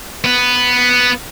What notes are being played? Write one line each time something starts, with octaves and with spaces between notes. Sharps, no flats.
B3 B4